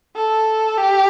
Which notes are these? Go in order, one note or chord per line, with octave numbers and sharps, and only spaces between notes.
A4
G4